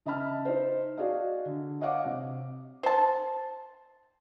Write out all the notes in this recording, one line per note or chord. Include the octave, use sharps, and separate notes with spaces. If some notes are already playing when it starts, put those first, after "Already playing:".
C#3 D#5 E5 A5 B5 F6
D#4 C5
F#4 G#4 D5 D#5 F5
D3
C#5 D#5 F5 F#5 D6
C3
C5 A5